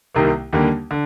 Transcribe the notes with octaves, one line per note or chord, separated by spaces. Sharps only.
C2 C3 D#3 A#3
D#2 D3 G3 A#3
D3